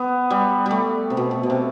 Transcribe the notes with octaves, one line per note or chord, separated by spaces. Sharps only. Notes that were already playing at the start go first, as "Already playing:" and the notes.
Already playing: B3
G3
G3 A3
C3
B2
B2
B2
C3